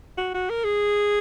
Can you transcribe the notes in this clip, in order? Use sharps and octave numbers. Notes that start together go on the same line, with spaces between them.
F#4
F#4
A#4
G#4